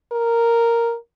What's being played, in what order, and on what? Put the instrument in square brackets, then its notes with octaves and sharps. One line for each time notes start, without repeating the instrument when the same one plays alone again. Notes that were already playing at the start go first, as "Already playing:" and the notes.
[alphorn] A#4